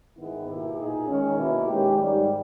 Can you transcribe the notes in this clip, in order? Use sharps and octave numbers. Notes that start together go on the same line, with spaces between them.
G#2 D#3 G#3 B3 E4
B2 A#3 E4 G4
A#2 A#3 D#4 G#4
D#3 G#3 C#4
B2 A#3 E4
D#3 G#3 C#4 G4
G#2 D#3 G3